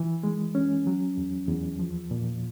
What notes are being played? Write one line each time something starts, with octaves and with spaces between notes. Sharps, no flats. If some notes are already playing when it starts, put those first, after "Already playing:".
Already playing: E3
G#3
C#4
F#3
E2
E2
F3
A#2